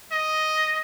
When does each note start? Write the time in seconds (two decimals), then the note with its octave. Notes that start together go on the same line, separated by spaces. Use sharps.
0.12 D#5